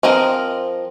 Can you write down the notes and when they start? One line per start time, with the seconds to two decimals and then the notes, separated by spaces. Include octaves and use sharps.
0.03 F3 C4 A#4 D#5